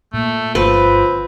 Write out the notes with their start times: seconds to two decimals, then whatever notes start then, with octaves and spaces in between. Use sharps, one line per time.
0.14 A#2 A3
0.55 G1 F3 C4 B4